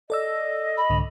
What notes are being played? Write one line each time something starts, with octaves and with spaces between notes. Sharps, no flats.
A4 D5 D#5 E6
B5
C2 G#2 D3